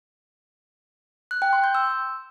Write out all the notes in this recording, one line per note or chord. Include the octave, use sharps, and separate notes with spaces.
F#6
G5
C6
G6
E6